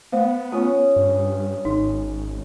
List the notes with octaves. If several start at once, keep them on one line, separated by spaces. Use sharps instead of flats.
A3 B3 C5 F5
A3 C#4 F4 D#6
G2
G#1 D#4